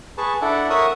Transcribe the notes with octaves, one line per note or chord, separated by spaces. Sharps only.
G#4 B4 A5 C#6
D4 E4 A4 D5 F#5
A#4 C#5 E5 F#5 C#6 D#6